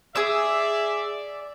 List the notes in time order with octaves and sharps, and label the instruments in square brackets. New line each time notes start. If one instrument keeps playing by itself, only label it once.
[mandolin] G#4 E6 [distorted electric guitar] D5 [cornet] E5